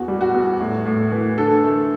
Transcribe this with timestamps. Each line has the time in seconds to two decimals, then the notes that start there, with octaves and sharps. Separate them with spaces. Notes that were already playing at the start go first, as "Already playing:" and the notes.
Already playing: E2 F#4
0.08 G3
0.21 F#4
0.34 E2
0.60 A2
0.85 A2
1.12 E3
1.38 D3 A4
1.64 A3